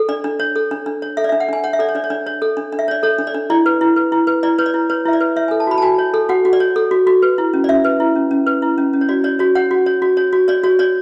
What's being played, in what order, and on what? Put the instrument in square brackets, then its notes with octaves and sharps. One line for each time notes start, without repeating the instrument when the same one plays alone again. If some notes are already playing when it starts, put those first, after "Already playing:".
Already playing: [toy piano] A4
D4 D5
D4
C#5
A4
D4
D4
C#5
A4 E5
D5
E5
D4
F#5
D4 G#5
C#5 F#5
E5
A4 D5
C#5
D4 D5
C#5
D4 D5
C#5
A4
D4
D4
E5
C#5 D5
A4 C#5
D4
D5
D4
E4 D5
B4
E4
B4
E4
B4
E4 D5
B4 C#5
D5
E4
B4 C#5
E4 E5
D5
B4
C#5 E5
A4 G#5
A5
F#4 B5
A5
F#4 G#5
C#5
A4
F#4 F#5
F#4
D5
C#5
A4
F#4
F#4
B4
E4
C#4
D5
C#4 E5
B4
E4
C#4
C#4
B4
E4
C#4
C#4
C#5
F#4 D5
C#5 D5
F#4 C#5
C#5 F#5
F#4
C#5
F#4
C#5
F#4
C#5 D5
F#4 C#5
C#5 D5